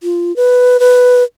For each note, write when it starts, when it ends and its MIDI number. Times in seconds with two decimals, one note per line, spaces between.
0.03 0.35 65
0.36 0.80 71
0.80 1.23 71